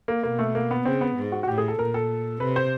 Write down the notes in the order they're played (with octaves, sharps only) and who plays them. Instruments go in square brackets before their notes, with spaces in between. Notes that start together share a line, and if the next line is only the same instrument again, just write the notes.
[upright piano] A#3
[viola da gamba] B2 [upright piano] A#3
[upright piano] A3
A#3
B3
[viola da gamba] C#3 [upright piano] C4
[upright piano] B3
[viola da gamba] G#2
[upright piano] F#4
F#4
[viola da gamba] A2 [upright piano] G4
[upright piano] G#4
A4
[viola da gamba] A#2 [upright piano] A#4
[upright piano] A4
[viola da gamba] C3 [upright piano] B4
[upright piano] C5